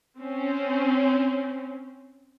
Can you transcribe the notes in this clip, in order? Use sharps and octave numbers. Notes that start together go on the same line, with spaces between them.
C4 C#4